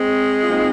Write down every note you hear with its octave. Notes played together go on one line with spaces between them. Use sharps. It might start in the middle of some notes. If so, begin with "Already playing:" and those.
Already playing: G#3 C4
F4
C4 D#4